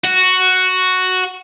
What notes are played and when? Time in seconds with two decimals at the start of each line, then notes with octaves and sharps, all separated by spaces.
0.04 F#4